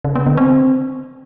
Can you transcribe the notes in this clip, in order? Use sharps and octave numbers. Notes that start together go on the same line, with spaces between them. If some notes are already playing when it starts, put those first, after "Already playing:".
C#3
B3
D3
C4